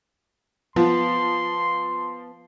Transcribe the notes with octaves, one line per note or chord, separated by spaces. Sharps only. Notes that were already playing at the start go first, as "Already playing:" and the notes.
F3 B3 C6